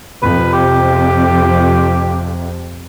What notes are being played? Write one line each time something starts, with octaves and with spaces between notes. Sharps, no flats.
F2 C3 B4
G4